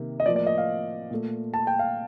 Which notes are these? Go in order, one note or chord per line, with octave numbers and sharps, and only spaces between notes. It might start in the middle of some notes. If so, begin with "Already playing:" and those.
Already playing: C3 D#3 A#3
D#5
A2 F3 A#3 D5
D5
D#5
F5
A#2 A3
A5
G5
F5